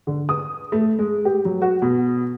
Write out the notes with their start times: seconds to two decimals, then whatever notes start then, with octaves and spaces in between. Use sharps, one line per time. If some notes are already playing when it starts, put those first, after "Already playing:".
0.07 D3
0.29 D#6
0.72 A3
0.99 G#3
1.25 G4
1.45 F#3
1.62 F#4
1.82 B2